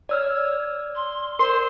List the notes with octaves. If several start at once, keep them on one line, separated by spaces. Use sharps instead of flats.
C#5 D5 E6 F6
C6
A#4 C5 C6